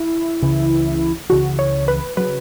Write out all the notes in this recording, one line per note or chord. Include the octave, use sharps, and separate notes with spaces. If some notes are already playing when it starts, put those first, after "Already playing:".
Already playing: E4
C#2 C#3 E3
C#2 C#3 E3 F#4
C#5
B4
C#3 F#3 B4